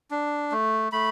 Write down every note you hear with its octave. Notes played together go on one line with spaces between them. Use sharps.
D4
A3
A3 B5